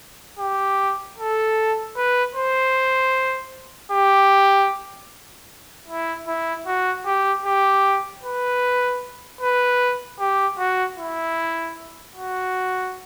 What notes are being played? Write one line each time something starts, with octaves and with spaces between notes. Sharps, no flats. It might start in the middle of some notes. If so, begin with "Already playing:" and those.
G4
A4
B4
C5
G4
E4
E4
F#4
G4
G4
B4
B4
G4
F#4
E4
F#4